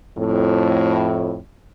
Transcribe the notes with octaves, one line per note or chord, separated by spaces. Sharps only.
F2 A2